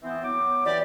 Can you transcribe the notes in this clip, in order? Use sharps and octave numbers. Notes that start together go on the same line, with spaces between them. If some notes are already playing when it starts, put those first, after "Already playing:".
E3 B3 C4
F#3 B3 D6
E3 F#4 G4 D5